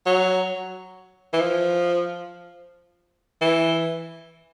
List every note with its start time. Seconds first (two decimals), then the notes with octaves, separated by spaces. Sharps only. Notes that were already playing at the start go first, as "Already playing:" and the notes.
0.06 F#3
1.33 E3
1.40 F3
3.41 E3